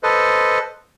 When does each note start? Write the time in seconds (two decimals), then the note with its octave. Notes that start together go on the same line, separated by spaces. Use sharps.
0.03 A4 B4 C5 D#5